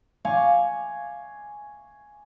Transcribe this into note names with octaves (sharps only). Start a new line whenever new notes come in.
F5 G#5 C#6 D6